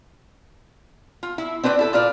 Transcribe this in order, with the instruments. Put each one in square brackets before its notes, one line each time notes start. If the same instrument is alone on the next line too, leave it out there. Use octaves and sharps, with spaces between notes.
[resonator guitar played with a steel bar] F4
E4
C4 D4 B4 C5 D5
E4 A4 B4
A#2 F4 B4 D5